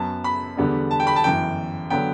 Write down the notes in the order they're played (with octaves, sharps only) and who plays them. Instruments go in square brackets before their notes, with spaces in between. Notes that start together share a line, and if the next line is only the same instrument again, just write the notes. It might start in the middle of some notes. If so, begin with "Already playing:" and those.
Already playing: [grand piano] F#2 F#3 B3 A5
B5
E2 D3 G3 B3 D4
A5
G5
B5
A5
G1 F#2 E3 G5
D3 F#3 B3 G5